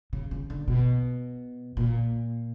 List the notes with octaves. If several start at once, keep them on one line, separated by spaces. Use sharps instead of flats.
C#3
C#3
D3
B2
A#2